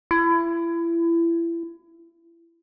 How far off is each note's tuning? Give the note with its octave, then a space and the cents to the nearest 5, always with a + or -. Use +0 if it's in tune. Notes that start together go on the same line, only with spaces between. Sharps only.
E4 +30